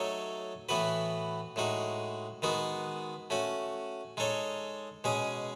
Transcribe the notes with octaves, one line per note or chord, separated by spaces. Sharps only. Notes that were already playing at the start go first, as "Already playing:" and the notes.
Already playing: F#3 A3 D#4 A4 C#5
A2 E3 B3 F#4 B4
A2 G#3 D#4 F#4
D#3 G#3 B3 F#4
A3 C#4 F#4
G#3 D#4 A4 C#5
B2 G#3 C#4 G#4